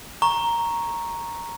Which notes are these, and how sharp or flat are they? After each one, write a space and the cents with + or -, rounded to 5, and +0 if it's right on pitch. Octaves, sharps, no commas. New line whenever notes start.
A#5 +0 C#6 -10